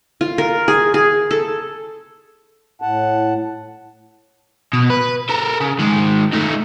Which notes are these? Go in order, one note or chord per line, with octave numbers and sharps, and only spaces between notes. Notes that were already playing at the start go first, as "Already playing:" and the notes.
F4
A#4
G#4
G#4
A4
A2 F#5 A5
B2
B4
A4 A#4
C#3
D#3 G#3
A3 D#4